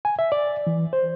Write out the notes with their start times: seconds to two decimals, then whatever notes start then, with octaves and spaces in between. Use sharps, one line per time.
0.05 G#5
0.19 E5
0.32 D5
0.67 E3
0.93 C5